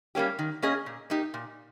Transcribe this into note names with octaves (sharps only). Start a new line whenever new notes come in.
G3 A#3 C#4 G4
D#3
A#3 C#4 G#4 D#5
A#2
A#3 D#4 G4
A#2